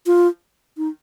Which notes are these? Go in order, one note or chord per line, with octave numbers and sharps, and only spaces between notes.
F4
D#4